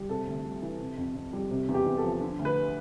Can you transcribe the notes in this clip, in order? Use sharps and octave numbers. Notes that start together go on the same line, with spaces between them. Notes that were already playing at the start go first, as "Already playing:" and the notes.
Already playing: G3
C3 A4
D2
G3
E3
C3
F2
F2
G3
C3
E2
G4
E2
A4
F3
D3
D2
B4